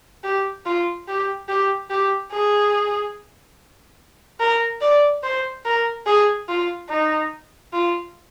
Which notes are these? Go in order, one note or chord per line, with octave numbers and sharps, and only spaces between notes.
G4
F4
G4
G4
G4
G#4
A#4
D5
C5
A#4
G#4
F4
D#4
F4